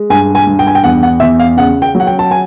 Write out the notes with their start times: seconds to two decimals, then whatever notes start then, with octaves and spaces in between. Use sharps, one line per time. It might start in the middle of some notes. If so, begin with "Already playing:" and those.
Already playing: G#3
0.10 G2 G#5
0.35 G#5
0.47 G2
0.59 G5
0.67 G#5
0.75 G5
0.84 E2 F#5
1.03 F#5
1.20 E2 E5
1.39 F5
1.57 C#3 F#5
1.82 G5
1.95 F#3
2.00 F#5
2.07 G5
2.19 A5
2.31 G#5